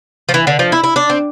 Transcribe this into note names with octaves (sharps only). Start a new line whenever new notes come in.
F3
E3
D3
F3
E4
E4
D4
C4